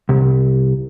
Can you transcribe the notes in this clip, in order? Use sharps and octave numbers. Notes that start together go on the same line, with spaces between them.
C2